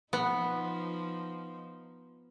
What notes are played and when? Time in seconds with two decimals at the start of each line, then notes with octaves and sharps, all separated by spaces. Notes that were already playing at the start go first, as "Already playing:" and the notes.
0.13 F3 B3 D#4